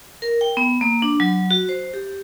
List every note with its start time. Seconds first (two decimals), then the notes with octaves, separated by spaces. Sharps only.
0.22 A#4
0.41 G5
0.57 B3
0.81 A#3
1.02 D4
1.20 F#3
1.51 F#4
1.69 C5
1.94 G4